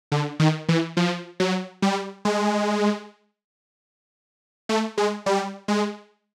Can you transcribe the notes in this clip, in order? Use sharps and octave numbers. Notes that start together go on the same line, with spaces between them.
D3
D#3
E3
F3
F#3
G3
G#3
A3
G#3
G3
G#3